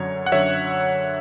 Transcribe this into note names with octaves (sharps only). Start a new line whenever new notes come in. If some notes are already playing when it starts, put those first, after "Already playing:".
Already playing: F#2 D3 F#3 C#5
F#5
F#2 D3 F#3 C#5 E5